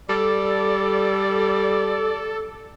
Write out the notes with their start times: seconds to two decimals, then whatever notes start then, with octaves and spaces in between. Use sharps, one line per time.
0.09 G3 A4 D5